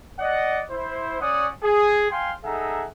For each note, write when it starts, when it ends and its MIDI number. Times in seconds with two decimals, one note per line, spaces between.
0.19 0.62 74
0.19 0.62 75
0.19 0.62 78
0.71 1.17 64
0.71 1.17 72
1.21 1.47 61
1.21 1.47 73
1.21 1.47 74
1.21 1.47 78
1.21 1.47 87
1.63 2.07 68
2.11 2.32 77
2.11 2.32 79
2.11 2.32 80
2.11 2.32 84
2.44 2.86 63
2.44 2.86 68
2.44 2.86 69
2.44 2.86 76
2.44 2.86 78
2.44 2.86 82